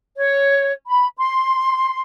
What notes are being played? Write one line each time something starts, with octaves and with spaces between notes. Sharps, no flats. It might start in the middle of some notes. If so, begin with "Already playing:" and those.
C#5
B5
C6